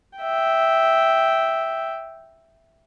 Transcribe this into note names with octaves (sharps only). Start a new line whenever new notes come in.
E5 G5